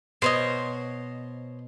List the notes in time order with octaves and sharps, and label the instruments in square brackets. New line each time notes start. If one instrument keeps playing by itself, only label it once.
[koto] B2 [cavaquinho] C5 C#5 D#5